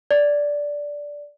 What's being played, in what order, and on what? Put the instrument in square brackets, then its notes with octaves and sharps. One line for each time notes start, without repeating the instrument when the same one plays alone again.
[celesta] D5